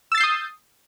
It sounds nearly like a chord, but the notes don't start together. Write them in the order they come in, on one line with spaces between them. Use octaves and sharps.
E6 A6 C7 G6 D#6